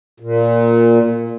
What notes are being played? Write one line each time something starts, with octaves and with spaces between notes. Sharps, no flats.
A#2